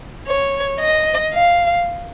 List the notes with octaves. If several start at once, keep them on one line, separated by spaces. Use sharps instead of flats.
C#5
D#5
F5